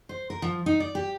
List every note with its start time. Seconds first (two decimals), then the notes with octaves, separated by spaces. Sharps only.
0.09 C5
0.30 A#4
0.42 F3
0.66 D#4
0.80 D5
0.95 G4